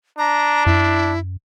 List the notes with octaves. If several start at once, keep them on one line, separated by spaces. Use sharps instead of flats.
D4 A#5
F#2 E4